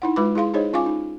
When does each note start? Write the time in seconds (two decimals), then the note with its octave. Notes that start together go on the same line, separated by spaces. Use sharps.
0.02 D#4 E4 F#5
0.16 G#3 F4 B4 B5 D6
0.35 E4 G#4 F5 C6
0.54 D#4 G#4 C5 C#5 D#5
0.73 C#4 F4 F5 G#5 D6
0.86 D#4